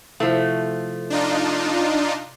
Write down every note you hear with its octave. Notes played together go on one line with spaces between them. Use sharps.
C3 F3 A3 E4 C5
D4 D#4 F4